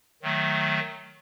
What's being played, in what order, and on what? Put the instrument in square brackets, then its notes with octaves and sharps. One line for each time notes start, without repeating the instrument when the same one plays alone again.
[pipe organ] D#3 F#3 A3